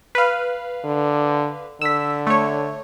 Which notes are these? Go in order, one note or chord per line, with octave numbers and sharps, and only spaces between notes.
B4 F5
D3
D3 E6 B6
A3 C#5